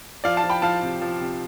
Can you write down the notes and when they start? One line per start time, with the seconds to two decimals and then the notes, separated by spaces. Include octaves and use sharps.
0.24 F3 D5 F5
0.37 F5 A5
0.44 F3
0.50 G5 B5
0.62 F3 F5 A5
0.82 C3
1.01 F3
1.21 C3